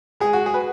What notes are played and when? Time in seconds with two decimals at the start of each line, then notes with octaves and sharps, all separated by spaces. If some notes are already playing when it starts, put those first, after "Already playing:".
0.20 G#3 G#4
0.33 F#4
0.46 G#4
0.54 B4